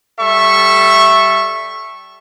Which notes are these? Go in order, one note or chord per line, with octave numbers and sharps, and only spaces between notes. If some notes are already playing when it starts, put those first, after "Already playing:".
G3 A4 E5 C#6